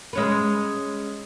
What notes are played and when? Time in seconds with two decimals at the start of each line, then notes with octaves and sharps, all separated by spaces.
0.13 G#3 C#4 B4